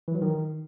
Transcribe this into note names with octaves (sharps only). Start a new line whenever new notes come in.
E3
F#3
D#3